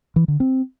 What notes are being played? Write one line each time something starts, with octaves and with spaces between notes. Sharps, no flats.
E3
D3
C4